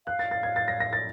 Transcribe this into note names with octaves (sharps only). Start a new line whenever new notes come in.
F5 F#6
A6
A6
G#6
A6
A#6
A#6
A6